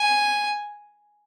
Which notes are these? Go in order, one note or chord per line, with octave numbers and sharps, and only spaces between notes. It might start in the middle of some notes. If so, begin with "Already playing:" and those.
Already playing: G#5